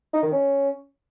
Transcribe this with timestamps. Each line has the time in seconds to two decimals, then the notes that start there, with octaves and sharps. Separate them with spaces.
0.13 D#4
0.23 D#3
0.32 C#4